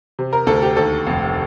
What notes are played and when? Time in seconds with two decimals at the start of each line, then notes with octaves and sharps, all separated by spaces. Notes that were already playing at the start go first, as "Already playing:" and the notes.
0.19 C3
0.33 A#4
0.47 D2 A4
0.62 G4
0.76 D#2 A4
1.07 F1